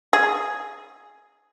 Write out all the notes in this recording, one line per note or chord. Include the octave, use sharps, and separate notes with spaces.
G#4